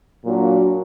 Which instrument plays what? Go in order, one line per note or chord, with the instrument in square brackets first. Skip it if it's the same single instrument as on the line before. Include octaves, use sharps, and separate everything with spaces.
[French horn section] A#2 F#3 A#3 D4 F#4